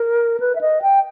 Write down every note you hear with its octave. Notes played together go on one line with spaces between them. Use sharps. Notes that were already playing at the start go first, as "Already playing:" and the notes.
Already playing: A#4
B4
E5
D#5
G5